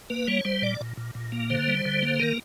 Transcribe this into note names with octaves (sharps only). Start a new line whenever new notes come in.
A#3 B4
G3 C#5
G3 C5
A#2 D5
A#2
A#2
A#2
A#3
D3 C5
G3
D3
A#3
D#3 A#4